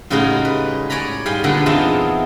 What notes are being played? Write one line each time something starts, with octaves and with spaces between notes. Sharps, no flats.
A2 C#3 G3 G#3 D#4 F#4
B4
C#5 D5 G#5 A#5 B5
G#2 G3 F5 G5 G#5
A#2 D3 B3 A4 F#5
E2 B3 C4 D#4 F4 A5